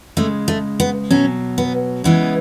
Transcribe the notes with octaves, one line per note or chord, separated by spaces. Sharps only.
C#3 G#3 A3
A3
B3
B2 F#3 C#4
B3
C#3 E3 G#3 B3